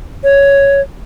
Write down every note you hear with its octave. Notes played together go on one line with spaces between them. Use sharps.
C#5